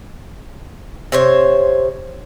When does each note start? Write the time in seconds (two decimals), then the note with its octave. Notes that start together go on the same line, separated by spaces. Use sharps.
1.12 C3 C5 C#5